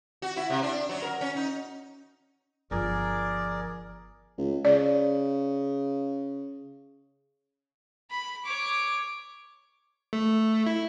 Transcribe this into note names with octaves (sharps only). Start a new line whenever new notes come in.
F#4
E4
C3
D4
F#3
A#4
C#4
D#4
G1 F3 G#4 A#4 D5
C#2
C#3 D5
B5
C#5 D6
A3
E4